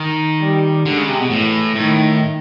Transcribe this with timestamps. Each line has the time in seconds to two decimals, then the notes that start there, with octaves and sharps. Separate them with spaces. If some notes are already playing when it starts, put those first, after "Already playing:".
Already playing: D#3
0.41 G3
0.85 D3 G#3
0.97 C#3
1.09 C3
1.19 B2
1.30 A2 E3
1.75 A2 D#3